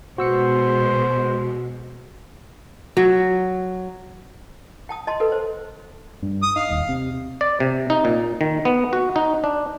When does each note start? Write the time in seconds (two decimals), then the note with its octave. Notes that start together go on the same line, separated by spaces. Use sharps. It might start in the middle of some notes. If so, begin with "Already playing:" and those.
0.18 B2 G#3 F#4 C5 E6 C#7
2.97 F#3
4.89 G5 A5 D#6
5.07 D#5 A5 C6
5.20 A4 B4
5.32 C5
6.22 G2
6.43 D#6
6.56 D#4 F5
6.71 D#1
6.89 C3
7.41 D5
7.60 C3
7.90 D#4
8.05 A#2
8.41 D#3
8.65 B3
8.93 F#4
9.16 D#4
9.44 D4